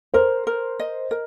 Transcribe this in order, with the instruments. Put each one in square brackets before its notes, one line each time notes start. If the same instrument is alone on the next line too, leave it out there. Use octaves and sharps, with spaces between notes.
[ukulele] A#4 [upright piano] C5
[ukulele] A#4
D#5
A#4